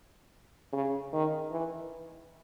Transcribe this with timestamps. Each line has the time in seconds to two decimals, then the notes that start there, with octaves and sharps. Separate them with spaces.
0.73 C#3
1.13 D#3
1.51 E3